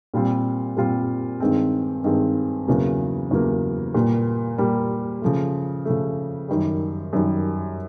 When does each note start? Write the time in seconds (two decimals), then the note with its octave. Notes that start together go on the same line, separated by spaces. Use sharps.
0.14 A#2 G3 C4 F4
0.77 A#2 G3 C4 F4
1.40 G2 D#3 G#3 C4
2.04 G2 D#3 G#3 C4
2.68 E2 C#3 F#3 A#3
3.31 E2 C#3 F#3 A#3
3.95 A#2 G3 A#3
4.58 A#2 G3 A#3
5.22 C#3 F3 A3
5.85 C#3 F3 A3
6.49 F#2 D#3 G3
7.13 F#2 D#3 G3